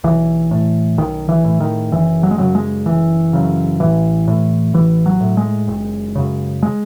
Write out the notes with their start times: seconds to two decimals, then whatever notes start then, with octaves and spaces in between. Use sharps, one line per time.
0.04 B1 E3
0.51 A2
0.98 B1 D#3
1.29 E3
1.44 A2
1.60 D#3
1.92 F#1 E3
2.23 F#3
2.31 G#3
2.38 F#2 C#3 F#3
2.55 G#3
2.86 F#1 E3
3.33 F#2 C#3
3.80 A1 E3
4.28 A2
4.74 A1 E3
5.06 F#3
5.20 A2
5.37 G#3
5.68 F#1
6.15 F#2 C#3
6.63 G#3